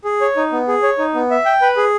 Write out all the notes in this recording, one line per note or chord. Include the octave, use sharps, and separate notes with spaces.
G#4
C#5
D#4
B3
G#4
C#5
D#4
B3
E5
G5
B4
G#4